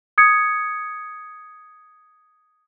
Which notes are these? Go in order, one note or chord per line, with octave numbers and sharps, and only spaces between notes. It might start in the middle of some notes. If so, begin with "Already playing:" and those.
D#6 G#6 C#7